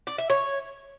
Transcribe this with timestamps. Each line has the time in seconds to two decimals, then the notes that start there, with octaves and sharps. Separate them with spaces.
0.07 D5
0.18 E5
0.30 C#5